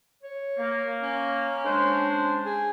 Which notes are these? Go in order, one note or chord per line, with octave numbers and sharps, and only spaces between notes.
C#5
A#3
C#4
G#3 D4 C5
G#4